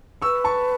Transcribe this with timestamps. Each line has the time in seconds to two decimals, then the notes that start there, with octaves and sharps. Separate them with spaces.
0.22 B4 C#6 E6
0.44 A5 C#6